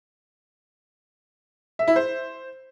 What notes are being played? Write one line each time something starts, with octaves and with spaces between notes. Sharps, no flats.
E5
E4
C5